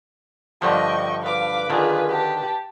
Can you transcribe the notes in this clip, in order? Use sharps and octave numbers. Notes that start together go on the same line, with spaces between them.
G2 D3 F3 D#5 G5 C#6
B4 F5 D6
D3 D#3 F4 G#4
G4 A5